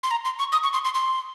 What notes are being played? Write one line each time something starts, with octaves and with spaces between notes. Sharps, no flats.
C6
A#5
C6
C#6
D#6
C#6
C6
C6
C6